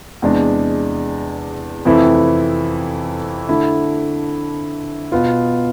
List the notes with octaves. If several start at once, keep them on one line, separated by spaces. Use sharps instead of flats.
E2 C3 G#3 D4
F2 C3 E3 A3 E4
D3 A3 E4
B2 B3 F4